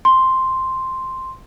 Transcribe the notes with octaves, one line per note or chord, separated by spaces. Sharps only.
C6